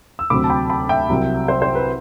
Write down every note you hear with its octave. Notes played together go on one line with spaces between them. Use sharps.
E6
D2 C3 F#3 C4 B5 D6
A5
G5 B5
G5 B5
E5 G5
C2 C3 F#3 C4
C5 E5
C5
B4